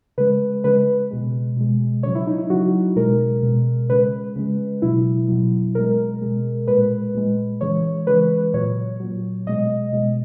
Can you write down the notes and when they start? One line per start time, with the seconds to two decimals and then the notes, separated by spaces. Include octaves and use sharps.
0.18 C#3 G#3 B4
0.64 C#3 G#3 B4
1.11 B2 G#3
1.57 B2 G#3
2.03 C#3 F#3 C#5
2.15 E4
2.27 D#4
2.38 E4
2.50 C#3 F#3 F#4
2.96 B2 G#3 A#4
3.43 B2 G#3
3.89 C#3 G#3 B4
4.36 C#3 G#3
4.82 B2 F#3 E4
5.28 B2 F#3
5.75 B2 G#3 A#4
6.22 B2 G#3
6.67 A#2 G#3 B4
7.15 A#2 G#3
7.61 C#3 E3 G#3 C#5
8.07 C#3 E3 G#3 B4
8.54 A#2 F#3 C#5
9.00 A#2 F#3
9.47 B2 G#3 D#5
9.93 B2 G#3